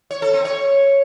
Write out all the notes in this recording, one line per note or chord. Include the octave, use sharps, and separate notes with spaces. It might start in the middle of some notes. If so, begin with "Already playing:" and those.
C#5
A4
C4
C#5